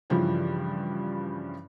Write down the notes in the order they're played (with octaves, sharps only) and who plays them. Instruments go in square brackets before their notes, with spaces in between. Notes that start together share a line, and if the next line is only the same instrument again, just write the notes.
[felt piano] G2 C#3 E3 F3 G3